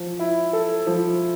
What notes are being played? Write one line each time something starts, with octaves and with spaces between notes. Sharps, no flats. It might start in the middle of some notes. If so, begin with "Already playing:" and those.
Already playing: F3
E4
A4
F3